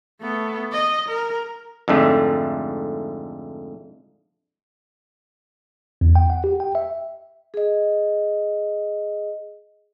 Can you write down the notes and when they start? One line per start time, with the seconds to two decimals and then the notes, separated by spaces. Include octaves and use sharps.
0.21 A3 B3
0.72 D#5
1.09 A#4
1.88 F2 G#2 D3 A3
6.01 E2
6.15 G5
6.30 F#5
6.44 G4
6.60 G5
6.75 E5
7.54 G#4 D#5